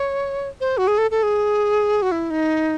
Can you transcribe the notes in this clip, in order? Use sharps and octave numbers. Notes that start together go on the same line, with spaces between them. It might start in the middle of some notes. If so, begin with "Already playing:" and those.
Already playing: C#5
C5
F#4
G#4
A4
A4
G#4
F#4
E4
D#4